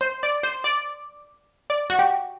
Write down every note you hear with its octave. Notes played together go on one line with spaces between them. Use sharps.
C5
D5
C5
D5
D5
F#4
G4